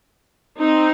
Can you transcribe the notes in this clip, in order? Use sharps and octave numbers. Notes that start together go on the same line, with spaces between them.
C4 D#4